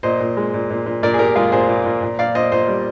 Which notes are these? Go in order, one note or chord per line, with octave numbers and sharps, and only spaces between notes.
A#2 C5 D#5
A#2
G#3
A#2
A#2
A#2
A#2 A#4 D5
G#4
A#2 G4 A#4
G#3 F4 G#4
A#2 G#4 C5
A#2
A#2
A#2
A#2 D5 F5
A#2 C5 D#5
A#2 C5 D#5
G3